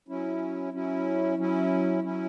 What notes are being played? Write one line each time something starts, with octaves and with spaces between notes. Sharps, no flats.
F#3 C#4 E4
F#3 C#4 E4
F#3 C#4 E4
F#3 C#4 E4